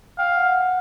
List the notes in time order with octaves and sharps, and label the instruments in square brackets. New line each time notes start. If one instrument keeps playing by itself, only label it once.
[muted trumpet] F5 [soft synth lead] G5
[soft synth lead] F#5